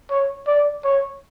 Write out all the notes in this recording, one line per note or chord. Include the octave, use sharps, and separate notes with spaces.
C#5
D5
C#5